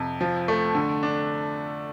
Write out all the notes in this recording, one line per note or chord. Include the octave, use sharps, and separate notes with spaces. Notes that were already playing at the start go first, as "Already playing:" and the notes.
Already playing: F2 C3
F3
A3
D3
D4